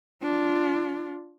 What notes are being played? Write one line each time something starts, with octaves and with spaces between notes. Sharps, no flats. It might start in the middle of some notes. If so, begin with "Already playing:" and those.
D4 F4